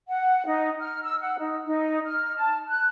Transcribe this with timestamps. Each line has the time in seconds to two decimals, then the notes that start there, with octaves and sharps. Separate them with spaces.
0.08 F#5
0.47 D#4
0.79 F6
1.03 E6
1.20 F#5
1.39 D#4
1.67 D#4
2.06 F6
2.37 A5
2.68 F#6